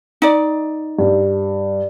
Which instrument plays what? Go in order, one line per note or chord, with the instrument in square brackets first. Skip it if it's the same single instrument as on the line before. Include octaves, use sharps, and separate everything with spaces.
[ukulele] D#4 D5
[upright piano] G2